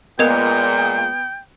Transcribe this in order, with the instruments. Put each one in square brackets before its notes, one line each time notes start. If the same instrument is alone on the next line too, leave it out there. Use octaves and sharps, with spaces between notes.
[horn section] A#2 G#3 [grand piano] B3 [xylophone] A#4 D#5 G#6 [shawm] G5